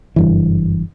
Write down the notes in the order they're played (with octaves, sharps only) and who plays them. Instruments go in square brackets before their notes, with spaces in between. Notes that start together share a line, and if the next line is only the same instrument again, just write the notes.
[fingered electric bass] F#1 G2 E3